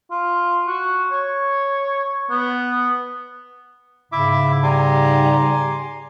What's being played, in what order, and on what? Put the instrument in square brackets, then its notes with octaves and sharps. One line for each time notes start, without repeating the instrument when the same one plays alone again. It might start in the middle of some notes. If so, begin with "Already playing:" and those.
[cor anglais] F4
F#4
C#5
B3
[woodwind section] G#2 C#3 [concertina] E4 E5 D6
[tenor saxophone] G3 [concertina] G#5 C6 D6 [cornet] A#5